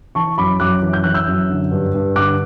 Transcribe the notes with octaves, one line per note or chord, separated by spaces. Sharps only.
E3 A5 C#6
F#2 B5 D6
F#2 D6 F#6
E3
G6
E3 F#6
E6 G6
F#2
D3
G2
G2
D3 D6 F#6